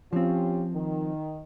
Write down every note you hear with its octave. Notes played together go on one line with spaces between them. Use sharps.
F3 C4 C#4 F4 G4
D#3